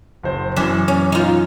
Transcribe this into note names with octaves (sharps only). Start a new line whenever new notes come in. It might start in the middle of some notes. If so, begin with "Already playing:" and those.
F#1 C5
F#2 E3 D4
C#4
D#4 F4